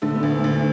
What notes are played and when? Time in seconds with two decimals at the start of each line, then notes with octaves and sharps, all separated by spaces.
0.02 D3 A3
0.15 B3
0.23 D2 A3
0.44 D2